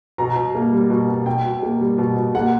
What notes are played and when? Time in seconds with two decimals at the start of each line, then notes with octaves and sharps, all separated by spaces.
0.18 B2 A#5
0.36 B2
0.55 A#3
0.72 G3
0.90 B2
1.08 B2
1.26 B2 G5
1.45 B2
1.62 A#3
1.81 G3
1.98 B2
2.16 B2
2.34 A#3 F#5